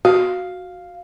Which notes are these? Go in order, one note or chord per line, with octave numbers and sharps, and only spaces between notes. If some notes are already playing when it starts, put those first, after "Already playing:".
F#4 F5